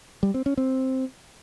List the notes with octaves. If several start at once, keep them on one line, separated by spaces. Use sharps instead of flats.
G3
C4
C#4
C4